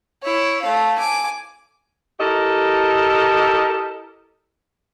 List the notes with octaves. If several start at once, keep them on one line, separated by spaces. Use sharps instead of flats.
E4 C#5
A3 F5
G#5 D6
E4 G4 A4 A#4 D#5